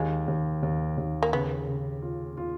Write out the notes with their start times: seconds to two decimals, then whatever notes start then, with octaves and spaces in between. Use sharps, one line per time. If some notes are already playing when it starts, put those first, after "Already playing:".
Already playing: D#2 G#3
0.28 D#2
0.63 D#2
0.98 D#2
1.23 A#3
1.32 C#3 B3
1.67 C#3
2.02 F4
2.37 F4